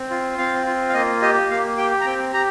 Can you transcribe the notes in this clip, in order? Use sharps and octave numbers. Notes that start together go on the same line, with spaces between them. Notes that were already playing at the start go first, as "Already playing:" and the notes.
Already playing: C4
F4
C4 F5
F4
F5
A#3 D#5
G4 D#5
A#3 F5
G4 G5
A#5
C4 G5
G4 A#5